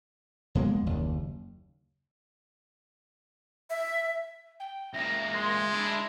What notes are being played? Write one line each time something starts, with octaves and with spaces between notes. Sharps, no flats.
F2 B2 G#3 A#3
F#1 D#2
E5
G5
C#2 A#3 E5 A#6
G#3 C6
D4 E4 E5